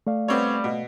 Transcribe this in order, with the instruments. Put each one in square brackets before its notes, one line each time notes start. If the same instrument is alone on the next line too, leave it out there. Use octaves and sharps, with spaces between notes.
[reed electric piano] A3 D5 F5
[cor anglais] G3 [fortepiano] B3 C4 C#5
[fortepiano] B2